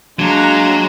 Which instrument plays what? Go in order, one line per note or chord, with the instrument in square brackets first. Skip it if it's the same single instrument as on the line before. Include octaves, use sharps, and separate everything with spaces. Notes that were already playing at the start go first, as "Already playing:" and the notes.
[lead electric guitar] F#3 [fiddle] G#3 A#5 [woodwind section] A#3 D4